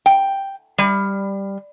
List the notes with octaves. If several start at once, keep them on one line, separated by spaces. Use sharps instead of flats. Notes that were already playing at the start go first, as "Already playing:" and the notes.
G5
G3